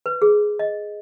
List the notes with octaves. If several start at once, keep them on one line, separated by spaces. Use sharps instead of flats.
B4
G#4
D#5